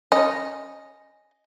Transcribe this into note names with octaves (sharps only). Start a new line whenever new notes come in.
C#4 D#5